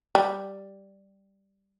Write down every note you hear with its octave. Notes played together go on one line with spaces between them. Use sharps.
G3